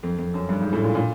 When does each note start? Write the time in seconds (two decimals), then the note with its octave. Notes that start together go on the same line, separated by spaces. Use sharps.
0.03 F2
0.18 F2
0.34 F#2
0.49 G2
0.60 G#2
0.73 A2
0.84 A#2
0.95 A#2